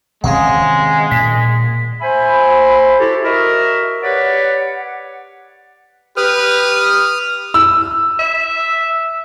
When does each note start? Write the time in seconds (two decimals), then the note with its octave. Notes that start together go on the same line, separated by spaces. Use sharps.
0.24 C3 D#3 G#3 C#4 F5 F#5
1.11 A#2 B6
2.01 C5 E5 G#5 B5
2.98 E4 F#4 G4 A4
3.24 F#4 A#4 D#5 E5
4.03 G4 B4 C#5 D5 F#5
6.17 G4 B4 D#6 F6
7.54 E6
8.19 E5